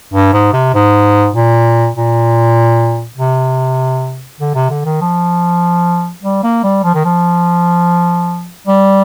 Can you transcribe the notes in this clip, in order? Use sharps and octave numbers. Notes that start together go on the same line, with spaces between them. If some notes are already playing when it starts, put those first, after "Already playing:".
G2
G#2
C3
G#2
A#2
A#2
C3
D3
C3
D3
D#3
F3
G3
A#3
G3
F3
D#3
F3
G3